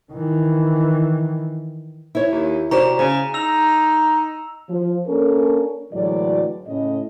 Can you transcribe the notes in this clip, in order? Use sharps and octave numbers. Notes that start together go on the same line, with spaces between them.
D#3 E3
E4 C#5
D#2
C3 F#4 C5 D5 A#5 E7
C#3 G#4 A#5
D#4 E6 F7
F3
A#3 C#4 D4 A4 A#4
D2 A2 E3 F#3 G#3 D5
A2 C#3 D#5